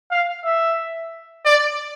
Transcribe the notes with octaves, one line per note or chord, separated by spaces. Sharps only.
F5
E5
D5